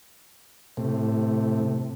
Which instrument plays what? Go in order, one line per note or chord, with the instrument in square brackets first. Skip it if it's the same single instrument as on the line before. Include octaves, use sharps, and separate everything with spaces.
[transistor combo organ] A2 C3